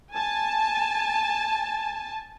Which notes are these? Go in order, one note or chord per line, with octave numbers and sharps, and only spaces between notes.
G#5 A5